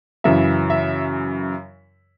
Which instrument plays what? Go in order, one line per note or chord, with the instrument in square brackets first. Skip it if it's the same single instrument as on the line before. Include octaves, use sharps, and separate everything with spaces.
[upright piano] F#2 C#3 E3 E5
E5